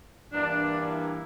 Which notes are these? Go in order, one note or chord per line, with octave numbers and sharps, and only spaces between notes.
G2 E3 A#3 D4
E4